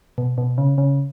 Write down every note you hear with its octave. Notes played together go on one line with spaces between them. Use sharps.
B2
B2
C#3
C#3